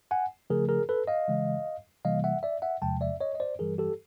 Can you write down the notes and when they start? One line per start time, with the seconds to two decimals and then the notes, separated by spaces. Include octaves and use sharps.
0.11 F#5 G#5
0.50 C#3 F3 A3 G#4 A#4
0.69 G#4 A#4
0.89 A4 B4
1.07 D#5 F5
1.28 C#3 E3 G#3
2.05 C3 E3 G3 A#3 D#5 F5
2.24 E5 F#5
2.43 D5 E5
2.62 E5 F#5
2.82 E2 C3 F3 G#3 G5 A5
3.01 D5 E5
3.21 C#5 D#5
3.35 D#5
3.40 C5 D5
3.59 G2 E3 G3 G#4 A#4
3.78 G4 A4